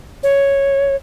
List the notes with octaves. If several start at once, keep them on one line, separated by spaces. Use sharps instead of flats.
C#5